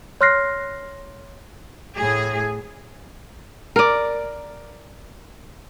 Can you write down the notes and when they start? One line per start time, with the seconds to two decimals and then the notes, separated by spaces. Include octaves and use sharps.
0.21 C#5 C6 F6 F#6 A#6 C7
1.97 A2 G#4
3.76 A#4 D5